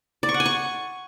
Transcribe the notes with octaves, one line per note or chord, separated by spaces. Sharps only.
D5
C#6
F#5
G#5
C#6